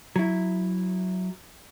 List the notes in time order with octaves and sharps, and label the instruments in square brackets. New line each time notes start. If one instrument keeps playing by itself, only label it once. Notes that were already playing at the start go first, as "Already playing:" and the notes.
[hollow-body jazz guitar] F#3 E4